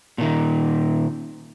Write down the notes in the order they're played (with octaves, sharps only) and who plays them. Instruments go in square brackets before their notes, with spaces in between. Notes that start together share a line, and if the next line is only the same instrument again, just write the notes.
[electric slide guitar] A#2 D#3